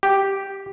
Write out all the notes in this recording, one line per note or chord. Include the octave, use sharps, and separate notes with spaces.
G4